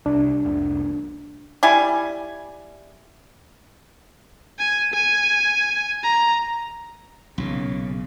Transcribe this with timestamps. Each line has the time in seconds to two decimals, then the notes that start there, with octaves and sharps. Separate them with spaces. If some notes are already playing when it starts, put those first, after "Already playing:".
0.06 C2 D4
0.45 F1 C2
1.63 G3 E4 G#5
4.59 G#5
4.93 G#5
6.03 A#5
7.38 B1 A#2 C#3